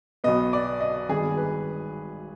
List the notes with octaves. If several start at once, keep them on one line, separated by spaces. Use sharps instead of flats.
B1 B2 B3 D#5
D5
D#5
G#1 G2 D#3 G#3 B3 G#4
B4